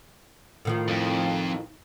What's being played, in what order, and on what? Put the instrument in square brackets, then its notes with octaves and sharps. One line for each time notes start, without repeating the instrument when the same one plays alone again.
[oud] A2 D#3 F3
[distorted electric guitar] F2